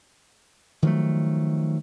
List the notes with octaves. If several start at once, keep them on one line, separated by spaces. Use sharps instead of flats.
D#3 F3 F#3 A3